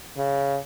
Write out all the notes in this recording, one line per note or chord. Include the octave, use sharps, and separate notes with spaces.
C#3